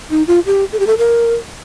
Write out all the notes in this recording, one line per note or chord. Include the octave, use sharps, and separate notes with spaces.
D#4
F4
G4
A4
G4
A4
A#4